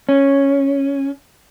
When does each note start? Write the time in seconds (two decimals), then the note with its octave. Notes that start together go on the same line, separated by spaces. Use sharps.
0.09 C#4